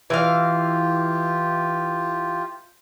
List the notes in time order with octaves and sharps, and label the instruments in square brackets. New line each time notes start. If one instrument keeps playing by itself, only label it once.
[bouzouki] E3 F5 [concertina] F4 G4